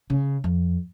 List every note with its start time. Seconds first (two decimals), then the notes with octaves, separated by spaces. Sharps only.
0.10 C#3
0.44 F2